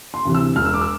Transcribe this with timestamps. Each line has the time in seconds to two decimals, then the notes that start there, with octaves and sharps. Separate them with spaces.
0.14 C6
0.25 D2 C3 E3
0.34 E6
0.56 E1 F6
0.65 E6
0.74 D6
0.81 E6